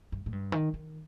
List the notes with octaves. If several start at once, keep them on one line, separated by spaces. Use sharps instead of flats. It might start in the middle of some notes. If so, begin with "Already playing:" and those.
G2
A2
G2
D#3
D#3